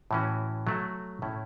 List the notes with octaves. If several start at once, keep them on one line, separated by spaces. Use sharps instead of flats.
A2 E3 C#4 F#4
F#3 A3 F#4
A2 A3 C#4 E4